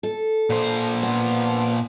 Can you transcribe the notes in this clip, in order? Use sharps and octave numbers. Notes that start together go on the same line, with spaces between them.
A4
A#2 C5
B3